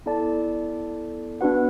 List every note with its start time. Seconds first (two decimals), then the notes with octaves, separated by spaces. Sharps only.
0.06 B3 E4 A4 D5 A5
1.41 B3 D4 F#4 B4 F#5